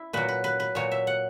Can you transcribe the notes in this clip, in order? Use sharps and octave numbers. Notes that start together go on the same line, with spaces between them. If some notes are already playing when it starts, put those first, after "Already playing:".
Already playing: E4
A#2 F#3 B4
B4
B4
B4
A#2 F#3 C#5
E5
F#5